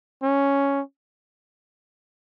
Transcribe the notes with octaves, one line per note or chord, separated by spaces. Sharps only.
C#4